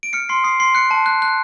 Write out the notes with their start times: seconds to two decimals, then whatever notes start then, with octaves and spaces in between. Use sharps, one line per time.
0.03 D7
0.13 F6 C#7
0.29 C6 C7
0.44 D#6 C7
0.60 C6 C7
0.75 F#6 C#7
0.91 A5
1.06 F#6
1.22 F#6